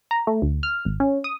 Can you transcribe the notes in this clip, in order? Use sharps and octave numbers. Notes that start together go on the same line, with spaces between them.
A#5
A3
D2
F6
G#1
C#4
D#6